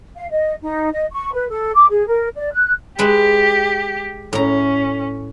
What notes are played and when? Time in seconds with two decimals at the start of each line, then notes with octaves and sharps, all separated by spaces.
0.16 F5
0.31 D#5
0.62 D#4
0.93 D#5
1.12 C#6
1.33 B4
1.49 A4
1.74 D6
1.90 G#4
2.07 A#4
2.36 D5
2.53 F#6
2.99 G#3 G4 B4 E5
4.33 A2 C#4 A#5